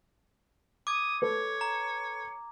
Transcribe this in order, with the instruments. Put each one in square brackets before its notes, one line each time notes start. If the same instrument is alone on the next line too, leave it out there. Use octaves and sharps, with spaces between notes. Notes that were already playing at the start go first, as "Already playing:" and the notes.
[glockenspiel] D6 G#6 [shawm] D#6
[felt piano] A4 B4 [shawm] C#5
[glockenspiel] A#5